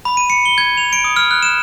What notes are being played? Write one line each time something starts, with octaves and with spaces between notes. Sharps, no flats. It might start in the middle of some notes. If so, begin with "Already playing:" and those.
B5
D#7
C#7
G7
G#6
F7
D7
D#6
F6
F#6
E7